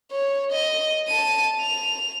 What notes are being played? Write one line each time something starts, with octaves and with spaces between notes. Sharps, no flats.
C#5
D#5
A5 D#7
F7